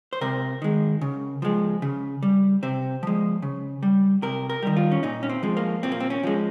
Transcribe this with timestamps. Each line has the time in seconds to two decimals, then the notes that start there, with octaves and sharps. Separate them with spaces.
0.13 C5
0.21 C3 A#4
0.62 D#3 G#3
1.01 C#3
1.42 F3 G#3
1.82 C#3
2.23 G3
2.63 C3 C5
3.03 F3 G#3
3.42 C#3
3.83 G3
4.22 C3 A#4
4.50 A#4
4.62 D#3 G3
4.77 F4
4.92 C#4
5.03 A#2 D#4
5.23 C#4
5.29 C4
5.43 F3 G#3
5.57 A#3
5.83 A#2 C4
5.92 A#3
6.00 C4
6.10 C#4
6.24 F3 G#3